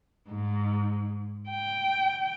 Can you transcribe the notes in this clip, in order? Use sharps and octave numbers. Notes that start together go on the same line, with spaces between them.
G#2
G5